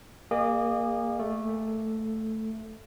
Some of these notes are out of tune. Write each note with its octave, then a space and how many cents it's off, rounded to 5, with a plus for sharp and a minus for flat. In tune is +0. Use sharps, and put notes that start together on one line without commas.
A#3 +0 G#4 -30 D#5 -40
A3 +0 A4 +0